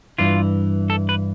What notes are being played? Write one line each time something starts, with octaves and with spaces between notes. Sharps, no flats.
G2 E3 F4
A4
B4